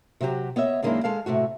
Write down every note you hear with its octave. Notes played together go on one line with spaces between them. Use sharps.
C3 F#3 F#4 G4
B3 C#5 D#5 E5
F#2 D#3 G#3 A#3 D4 E4
G#3 A4 F5
A2 C3 A3 F#4